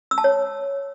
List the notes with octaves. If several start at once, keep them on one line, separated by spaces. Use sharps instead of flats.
E6
A5
C#5